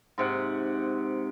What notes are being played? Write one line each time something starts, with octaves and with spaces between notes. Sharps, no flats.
G#2 C3 F#5